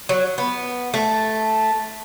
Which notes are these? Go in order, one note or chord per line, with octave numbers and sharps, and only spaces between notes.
F#3
B3
A3